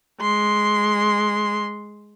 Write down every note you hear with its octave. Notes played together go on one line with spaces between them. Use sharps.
G#3 C6